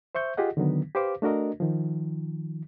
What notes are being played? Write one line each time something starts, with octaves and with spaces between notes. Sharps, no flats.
C5 E5 C#6 G6
F4 G4 G#4 D#5 F#5
D3 D#3 F#3 B3
G4 B4 C5 F5 D6
A3 D4 F#4 A#4 D#5
D#3 F3